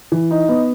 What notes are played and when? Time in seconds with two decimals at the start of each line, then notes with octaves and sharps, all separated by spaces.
0.12 E3
0.31 D#4
0.48 B3